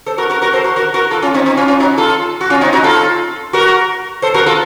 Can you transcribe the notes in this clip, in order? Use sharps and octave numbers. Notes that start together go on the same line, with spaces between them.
A4 C5
F#4 A#4
F#4 A#4
F#4 A#4
A4 C5
F#4 A#4
F#4 A#4
F#4 A#4
F4 A4
C#4 F4
C4 D#4
C4 D#4
C#4 F4
C#4 F4
D#4 F#4
F4 A4
F#4
C#4 F4
C4 D#4
D#4 F#4
F4 A4
F#4 A#4
A4 C5
F#4 A#4
F4 A4